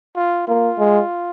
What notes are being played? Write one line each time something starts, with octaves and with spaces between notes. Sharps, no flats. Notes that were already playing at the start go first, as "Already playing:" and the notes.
F4
A#3 F4
G#3